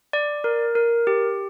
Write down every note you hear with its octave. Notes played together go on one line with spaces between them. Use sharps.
D5
A#4
A#4
G4